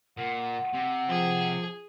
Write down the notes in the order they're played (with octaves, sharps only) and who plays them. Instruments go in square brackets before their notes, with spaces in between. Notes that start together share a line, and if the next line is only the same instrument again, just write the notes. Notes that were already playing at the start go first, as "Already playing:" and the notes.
[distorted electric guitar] A#2 [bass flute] F#5
[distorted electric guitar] C3
[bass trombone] F3 [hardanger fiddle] G#4